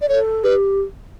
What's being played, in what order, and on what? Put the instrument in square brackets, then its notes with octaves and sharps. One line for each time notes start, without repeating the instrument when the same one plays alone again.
[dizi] D5
[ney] A4 [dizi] C#5
[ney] G4 [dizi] B4